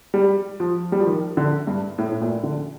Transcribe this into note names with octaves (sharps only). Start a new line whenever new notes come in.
G3
F3
G3
F3
D#3
D3
G2
A2
A2
A#2
D3